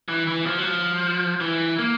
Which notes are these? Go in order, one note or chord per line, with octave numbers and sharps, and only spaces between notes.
E3
E3
F3
F#3
F3
E3
A#3